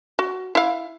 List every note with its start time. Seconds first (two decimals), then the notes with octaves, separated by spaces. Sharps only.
0.19 F#4
0.55 E4 F5